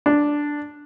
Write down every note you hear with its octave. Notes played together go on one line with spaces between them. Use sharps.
D4